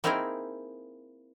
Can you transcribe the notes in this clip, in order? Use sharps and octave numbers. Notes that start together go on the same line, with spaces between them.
A#3 C4 D#4 E4 G#4 A#4